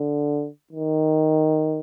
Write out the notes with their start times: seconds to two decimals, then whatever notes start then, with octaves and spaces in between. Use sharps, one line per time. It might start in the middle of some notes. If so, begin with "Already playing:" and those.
Already playing: D3
0.73 D#3